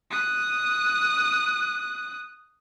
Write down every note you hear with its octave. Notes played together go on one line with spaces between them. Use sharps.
D#6 F#6